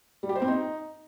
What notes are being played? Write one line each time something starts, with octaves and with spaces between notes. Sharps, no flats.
G3
G4
C5
C4
D#4